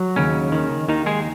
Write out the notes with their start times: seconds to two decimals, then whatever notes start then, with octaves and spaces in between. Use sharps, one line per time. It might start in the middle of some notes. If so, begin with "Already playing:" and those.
Already playing: F#3
0.16 D#2 C#3 C#4
0.52 D#3
0.88 D#2 D#3 D#4
1.06 G#3 G#4